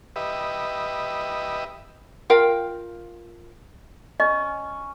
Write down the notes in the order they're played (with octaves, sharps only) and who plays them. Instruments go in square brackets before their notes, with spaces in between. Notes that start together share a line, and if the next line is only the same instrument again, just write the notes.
[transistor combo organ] G4 B4 D#5 E5
[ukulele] F4 A#4 F5 G5
[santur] C#4 [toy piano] D#5